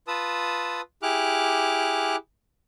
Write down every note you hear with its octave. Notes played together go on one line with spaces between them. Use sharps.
F4 B4 A5 D#6 E6
E4 G4 G#4 D6 F6 F#6